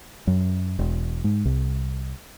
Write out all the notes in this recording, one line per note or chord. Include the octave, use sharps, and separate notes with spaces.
F#2
E1
G#2
C2